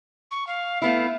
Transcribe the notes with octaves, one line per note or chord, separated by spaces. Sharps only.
C#6
F5
A3 B3 E4 F5